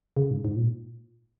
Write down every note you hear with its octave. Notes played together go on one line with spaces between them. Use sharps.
C#3
G#2
G#2
A#2